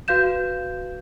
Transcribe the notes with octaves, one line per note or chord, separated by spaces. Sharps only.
F#4 B4 F5 G6 E7